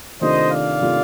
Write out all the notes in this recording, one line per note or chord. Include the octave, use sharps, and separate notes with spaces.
C3 D#3 A3 D4 F4 C5 D#5
D5 F5
C3 D#3 A3 D4 F4